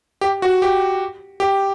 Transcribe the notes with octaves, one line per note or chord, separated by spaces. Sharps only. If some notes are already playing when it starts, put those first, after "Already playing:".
G4
F#4
G4
G4